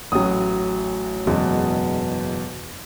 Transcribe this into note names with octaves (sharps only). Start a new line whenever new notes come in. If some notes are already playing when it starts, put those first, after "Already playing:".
A1 A2 F#3 D#6
F#1 E2 B2 G#3